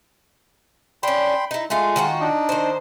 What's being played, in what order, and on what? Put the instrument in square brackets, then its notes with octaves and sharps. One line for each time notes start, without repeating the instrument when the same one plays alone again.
[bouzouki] C#4 D4 [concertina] G5 B5 C6
[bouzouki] D#4 E4
[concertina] G#3 [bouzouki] A3 F4 F5
[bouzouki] D#3 F4 F#4
[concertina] D4 D#4
[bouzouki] D#3 C5